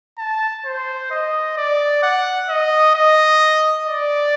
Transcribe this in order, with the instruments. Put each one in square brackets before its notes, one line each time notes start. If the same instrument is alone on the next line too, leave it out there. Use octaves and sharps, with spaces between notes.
[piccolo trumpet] A5
C5
D#5
D5
F#5
D#5
D#5
D5